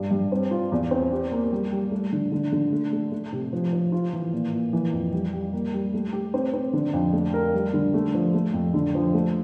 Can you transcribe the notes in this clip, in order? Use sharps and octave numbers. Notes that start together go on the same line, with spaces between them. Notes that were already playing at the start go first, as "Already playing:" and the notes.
Already playing: G2
G2
C4
F4
E2
C4
G4
A#3
G3
G3
A3
D3
D3
D3
A3
A3
A3
C3
F3
F3
F4
E3
A#2
A#2
E3
F2
G3
G3
A#3
G3
A3
G4
C4
C4
D3
F2
A3
A#4
G3
D3
A3
F3
A3
F2
D3
F3
A3